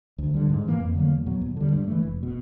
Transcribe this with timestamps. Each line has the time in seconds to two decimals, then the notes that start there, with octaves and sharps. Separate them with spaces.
0.18 D2
0.34 D3 G3
0.49 G#2
0.65 E3 G3 A#3
0.80 F2
0.95 D3 F#3 A#3
1.11 E2
1.26 B2 F#3 B3
1.41 D#2
1.57 D3 G3
1.72 G2
1.88 E3 A3
2.03 F1
2.23 B2